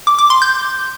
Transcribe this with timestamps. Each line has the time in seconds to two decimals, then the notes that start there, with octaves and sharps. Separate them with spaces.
0.07 D6
0.19 D6
0.30 C6
0.42 G6